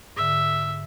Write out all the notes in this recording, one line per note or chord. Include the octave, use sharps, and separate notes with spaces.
G#2 D3 E5